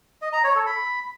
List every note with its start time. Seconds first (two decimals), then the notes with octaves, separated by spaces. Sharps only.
0.22 D#5
0.33 A#5
0.44 C#5
0.55 A4
0.66 B5